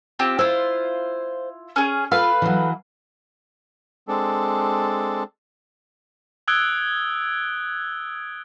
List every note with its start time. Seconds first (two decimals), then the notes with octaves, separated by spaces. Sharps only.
0.19 C4 F4 G4
0.39 E4 F4 C5
1.76 C#4 G#4
2.11 A3 F4 B4 F5
2.42 E3 F#3
4.08 G#3 C4 D4 A4
6.48 D#6 E6 F#6 G#6 D7 G7